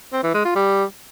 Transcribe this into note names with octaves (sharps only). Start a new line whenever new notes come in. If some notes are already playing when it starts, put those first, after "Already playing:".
C4
E3
G#3
F4
G3